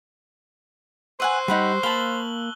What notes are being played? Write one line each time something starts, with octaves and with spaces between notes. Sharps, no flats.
B4 C5 F#5 G#5 C#6 E6 F#6
G3 D#4 G4 F#5 B5
A#3 F5 A5 B5 F#7 G7